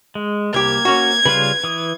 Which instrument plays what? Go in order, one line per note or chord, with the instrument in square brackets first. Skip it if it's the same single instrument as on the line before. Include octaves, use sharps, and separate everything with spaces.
[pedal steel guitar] G#3
[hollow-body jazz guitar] C2 G4 [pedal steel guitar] A#3 [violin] G#6
[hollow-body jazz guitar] C#4 F#4
[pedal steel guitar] C#3 G3 F4 [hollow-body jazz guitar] B4
[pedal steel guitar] E3 D#6